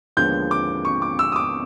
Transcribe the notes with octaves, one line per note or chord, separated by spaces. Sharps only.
D#2 D3 F3 G#3 B3 G6
D6
C#6
D6
E6
D#6
D6